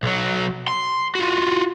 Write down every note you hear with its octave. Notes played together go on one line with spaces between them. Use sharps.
B1 F#3
C6
F4 F#4